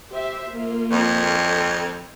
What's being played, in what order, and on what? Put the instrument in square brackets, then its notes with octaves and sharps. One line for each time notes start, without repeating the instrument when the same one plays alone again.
[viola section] G4 C5 E5
A#3 F4
[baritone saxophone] F2
[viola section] A4